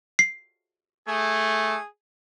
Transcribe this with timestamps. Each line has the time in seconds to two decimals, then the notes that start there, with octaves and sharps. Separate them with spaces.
0.19 C7
1.08 A3 G#4